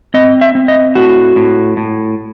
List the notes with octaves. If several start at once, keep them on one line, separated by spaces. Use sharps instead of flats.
C4 D#5
E5
C4
D#5
A2 F#4
A2
A2